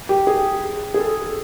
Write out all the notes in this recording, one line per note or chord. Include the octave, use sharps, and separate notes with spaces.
G4
G#4
G#4
A4